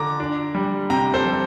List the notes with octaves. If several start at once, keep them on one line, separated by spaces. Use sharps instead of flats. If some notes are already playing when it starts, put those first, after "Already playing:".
Already playing: D3 A#5 D6
D4
G3
C3 G5 A#5
A4 C5
G3